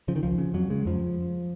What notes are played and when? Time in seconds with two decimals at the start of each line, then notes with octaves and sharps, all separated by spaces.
0.08 C#3 F3
0.16 D#3
0.23 C#2 F3
0.38 C#3
0.54 F2 F#3
0.70 C#3 G#3
0.86 F2 F3